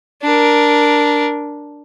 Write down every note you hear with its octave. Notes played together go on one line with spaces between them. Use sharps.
D4 A#4